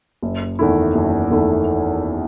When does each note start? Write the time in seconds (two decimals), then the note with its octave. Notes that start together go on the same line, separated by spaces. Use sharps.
0.23 F#1
0.59 E2 D#3 A3 E4
0.95 F#1
1.30 E2 D#3 A3 E4